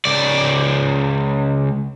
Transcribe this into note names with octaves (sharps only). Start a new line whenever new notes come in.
C#2 D5